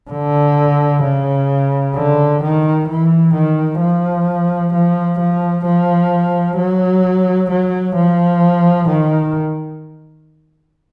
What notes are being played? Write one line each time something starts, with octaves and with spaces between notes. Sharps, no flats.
D3
C#3
D3
D#3
E3
D#3
F3
F3
F3
F3
F#3
F#3
F3
D#3